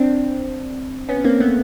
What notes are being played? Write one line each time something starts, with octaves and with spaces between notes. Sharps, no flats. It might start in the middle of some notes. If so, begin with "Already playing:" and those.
Already playing: C4 D4
B3 C#4
A#3 C4
A3 B3